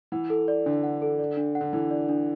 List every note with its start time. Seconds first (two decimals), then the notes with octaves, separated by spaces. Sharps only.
0.12 E3 F#5
0.30 A4
0.48 D5
0.66 D3 D4
0.83 F#5
1.02 A4
1.19 D5
1.37 D4
1.55 F#5
1.61 D3
1.73 E3 A4
1.91 D5
2.09 D4